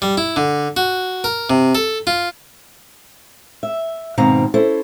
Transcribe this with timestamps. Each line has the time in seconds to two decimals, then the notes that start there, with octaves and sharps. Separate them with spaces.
0.02 G3
0.18 E4
0.36 D3
0.77 F#4
1.24 A#4
1.50 C3
1.75 A4
2.07 F4
3.63 E5
4.18 G#2 B2 D#3 C4 F5 A#5
4.54 C#4 E4 A4 C5